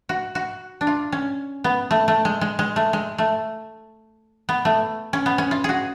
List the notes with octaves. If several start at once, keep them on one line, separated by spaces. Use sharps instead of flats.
F#4
F#4
D4
F4
C#4
B3
A3
A3
G#3
G#3
G#3
A3
G#3
A3
B3
A3
C#4
B3
C#4
F4
F#4 G#4